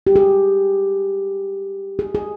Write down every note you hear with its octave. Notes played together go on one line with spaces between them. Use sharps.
G4
G#4
G#4
G#4